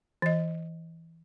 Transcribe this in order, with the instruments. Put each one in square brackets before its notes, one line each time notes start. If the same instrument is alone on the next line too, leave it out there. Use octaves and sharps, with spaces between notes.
[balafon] E3 D#5